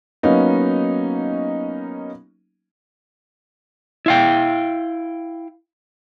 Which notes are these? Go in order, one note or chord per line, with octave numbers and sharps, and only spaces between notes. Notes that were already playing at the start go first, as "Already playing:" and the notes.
F#3 A#3 B3 C#4 D#4
E4 F5 G5